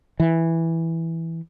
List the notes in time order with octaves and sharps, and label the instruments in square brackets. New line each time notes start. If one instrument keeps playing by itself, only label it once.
[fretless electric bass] E3